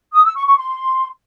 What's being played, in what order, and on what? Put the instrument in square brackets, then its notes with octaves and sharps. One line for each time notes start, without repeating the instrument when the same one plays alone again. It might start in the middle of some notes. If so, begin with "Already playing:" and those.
[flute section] D#6
E6
C#6
C#6
C6